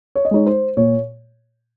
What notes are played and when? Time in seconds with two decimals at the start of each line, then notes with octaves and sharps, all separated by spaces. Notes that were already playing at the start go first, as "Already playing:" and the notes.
0.15 C#5
0.25 D#5
0.31 G#3 D#4 C#5
0.47 C5
0.77 A#2 C#5